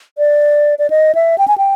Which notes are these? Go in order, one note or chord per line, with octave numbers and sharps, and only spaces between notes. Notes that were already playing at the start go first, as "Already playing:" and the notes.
D5
D5
D#5
E5
G5
G#5
G5